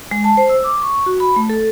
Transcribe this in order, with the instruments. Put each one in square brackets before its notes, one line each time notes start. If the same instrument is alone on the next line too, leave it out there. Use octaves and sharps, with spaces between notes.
[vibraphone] G#3
A5
C5
E6
D6
C#6
F#4
B5
A3
A4